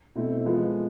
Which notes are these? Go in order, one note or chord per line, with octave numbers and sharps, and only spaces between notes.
B2 A3 C4 E4
F3 G#3 B3 F4